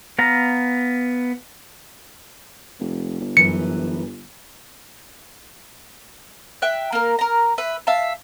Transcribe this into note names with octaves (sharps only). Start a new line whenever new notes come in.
B3 F5 A#5
F1
G1
F#2 E3 C#7
E5 G5 F#6
A#3 A#4
A#4 A#5
B4 E5
E5 F5 A5